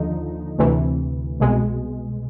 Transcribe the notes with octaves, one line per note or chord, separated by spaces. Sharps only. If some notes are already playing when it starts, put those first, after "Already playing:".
Already playing: D#2 D3 F3 D#4
D2 C3 E3
C2 B2 G#3